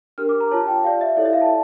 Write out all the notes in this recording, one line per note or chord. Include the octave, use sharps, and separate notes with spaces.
D4 G4 A#4 F6
D6
A#5
F4 C#5 A5
G5
G4 D5 F5
E5
E4 A4 C#5 D5
E5
F5
A5